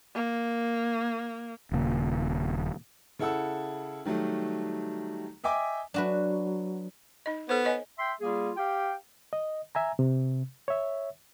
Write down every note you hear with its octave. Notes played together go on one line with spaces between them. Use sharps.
A#3
D#1 C#3 A#3
C#3 E4 A4 F#5 E6
D#3 F#3 G3 A3
D#5 E5 G5 G#5 D6
F#3 D4 F#4 B4
D#4 D#5
B3 A4 C5
C#5 D#5 G#5
E5 G5 C6
G3 A#3 F4 G#4
G4 F5 G5
D#5
E5 G#5 A#5
C3
C#5 E5